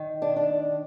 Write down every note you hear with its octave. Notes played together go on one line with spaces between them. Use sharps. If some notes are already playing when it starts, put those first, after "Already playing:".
Already playing: D#3
D4
D4